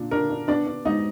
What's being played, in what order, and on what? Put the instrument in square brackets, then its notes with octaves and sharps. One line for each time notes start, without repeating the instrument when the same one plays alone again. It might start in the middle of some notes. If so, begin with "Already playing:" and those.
Already playing: [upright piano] A#2 D4
D4 A#4
D4
B3 D4 D5
D4
G#2 D#4 D#5